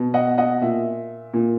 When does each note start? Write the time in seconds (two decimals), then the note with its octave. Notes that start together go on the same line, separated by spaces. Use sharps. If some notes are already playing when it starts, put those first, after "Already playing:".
Already playing: B2
0.14 D#5 F#5
0.38 D#5 F#5
0.61 A#2 E5
1.34 A#2